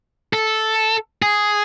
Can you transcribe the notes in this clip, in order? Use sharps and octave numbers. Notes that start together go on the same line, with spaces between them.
A4
G#4